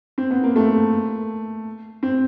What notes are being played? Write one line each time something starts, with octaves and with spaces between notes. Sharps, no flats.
C4
B3
A#3
A3
C4